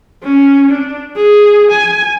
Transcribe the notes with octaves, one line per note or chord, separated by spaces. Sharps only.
C#4
D4
G#4
G#5